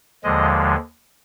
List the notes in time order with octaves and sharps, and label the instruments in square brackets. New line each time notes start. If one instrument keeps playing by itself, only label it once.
[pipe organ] D#2 D3 F3 G#3 D#5